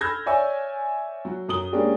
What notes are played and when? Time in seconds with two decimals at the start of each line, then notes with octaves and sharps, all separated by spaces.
0.01 B5 E6 F6 G6 G#6 A#6
0.26 C#5 D5 E5 G#5 C#6 E6
1.25 F#3 F#4
1.48 F#2 D#6 G7
1.72 G#3 A#3 C#4 D4 G4 G#4